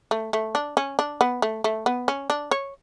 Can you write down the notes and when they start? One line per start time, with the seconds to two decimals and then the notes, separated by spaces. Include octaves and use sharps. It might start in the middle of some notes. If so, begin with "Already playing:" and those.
0.11 A3
0.33 A3
0.55 D4
0.77 C#4
0.99 D4
1.21 B3
1.42 A3
1.64 A3
1.86 B3
2.08 C#4
2.30 D4
2.51 C#5